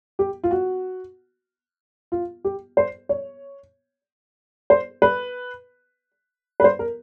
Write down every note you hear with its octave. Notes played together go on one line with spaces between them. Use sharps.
G4
F4
F#4
F4
G4
C5
C#5
C5
B4
B4
C5
A#4